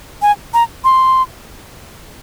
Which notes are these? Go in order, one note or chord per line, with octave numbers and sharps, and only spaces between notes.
G#5
A#5
C6